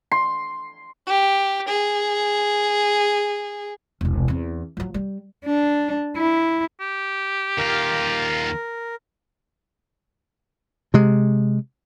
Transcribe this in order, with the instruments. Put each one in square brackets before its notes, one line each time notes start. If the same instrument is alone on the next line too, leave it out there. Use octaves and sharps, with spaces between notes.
[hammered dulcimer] C6
[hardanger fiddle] G4
G#4
[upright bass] E1 C2
E2 C4
F3 F#3
G3
[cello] D4
E4
[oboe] G4
[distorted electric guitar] D#2 F4 [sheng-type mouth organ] A#4
[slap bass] C3 G#3